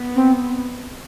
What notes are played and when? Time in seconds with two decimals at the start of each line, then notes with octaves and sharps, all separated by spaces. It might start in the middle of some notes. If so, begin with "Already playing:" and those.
Already playing: B3
0.15 C4